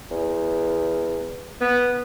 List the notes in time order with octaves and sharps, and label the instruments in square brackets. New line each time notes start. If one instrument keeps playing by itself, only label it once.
[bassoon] E2
[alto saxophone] B3